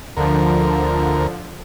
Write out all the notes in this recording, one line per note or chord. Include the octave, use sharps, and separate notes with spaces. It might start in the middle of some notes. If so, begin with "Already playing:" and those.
D2 D3 F3 A#4